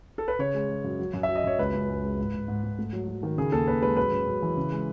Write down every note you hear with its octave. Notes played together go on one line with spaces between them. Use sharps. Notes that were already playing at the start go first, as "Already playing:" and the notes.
A4
B4
C#3 C#5
G#3
G#3
F#2
F#3
F#2
E5
F#3
D#5
F#2 C#5
C#2 B4
C#2
C#2
G#3
G#2
G#2
G#2
G#2
A3
F#3
F#3
D#3
C#3 G#4
D#2 A4
D#2 B4
G#3 B4
F#2 B4
F#2
F#2
E3
C#3
G#3